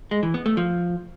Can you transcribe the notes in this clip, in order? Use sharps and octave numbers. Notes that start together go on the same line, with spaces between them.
G#3
E3
B3
A3
F3